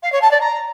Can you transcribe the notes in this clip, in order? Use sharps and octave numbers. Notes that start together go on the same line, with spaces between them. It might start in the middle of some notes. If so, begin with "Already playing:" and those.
F5
C#5
A5
D5
A#5